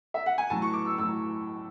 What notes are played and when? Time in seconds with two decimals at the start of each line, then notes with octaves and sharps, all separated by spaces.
0.14 E5
0.26 F#5
0.38 G#5
0.50 A2 F#3 A5
0.62 C#6
0.74 D6
0.86 E6
0.98 A2 F#3 E6